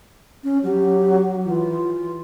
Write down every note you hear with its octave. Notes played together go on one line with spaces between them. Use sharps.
C#4
F#3 G4
E3 F4